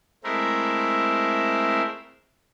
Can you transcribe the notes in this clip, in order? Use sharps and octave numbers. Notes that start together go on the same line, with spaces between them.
G#3 A3 C4 E4 A#4 E5